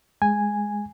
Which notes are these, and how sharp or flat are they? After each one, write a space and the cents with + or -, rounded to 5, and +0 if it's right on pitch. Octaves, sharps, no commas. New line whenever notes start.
G#3 +0 G#5 -5